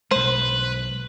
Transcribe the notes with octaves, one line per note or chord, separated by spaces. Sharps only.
B1 G#3 B4 C5